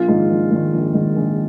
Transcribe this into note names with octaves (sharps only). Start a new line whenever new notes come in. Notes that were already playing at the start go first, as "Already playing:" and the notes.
Already playing: A#1 F4
G#2 D#3
A#1
G#2 D#3
A#1
G#2 D#3
A#1